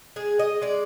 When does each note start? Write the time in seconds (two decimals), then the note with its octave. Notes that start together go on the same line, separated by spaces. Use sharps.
0.16 G#3 G#4
0.39 D#5
0.62 G#3 D5